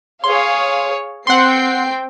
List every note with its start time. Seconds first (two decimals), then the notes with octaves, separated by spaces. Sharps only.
0.24 G#4 C#5 F5 C6
1.27 C4 F#5 G5 C6 C7